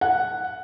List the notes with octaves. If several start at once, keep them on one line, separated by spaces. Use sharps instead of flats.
F#5